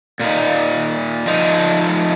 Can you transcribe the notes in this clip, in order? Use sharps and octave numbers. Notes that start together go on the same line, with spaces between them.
A#2 A#3 D#4
F3 G#3 D#4